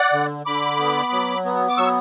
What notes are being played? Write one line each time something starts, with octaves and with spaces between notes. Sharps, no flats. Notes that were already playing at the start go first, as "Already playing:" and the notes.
Already playing: D5 F#5
D3
D3 B5 D6
B3
F#3
B3
D6
F#3 C#6 E6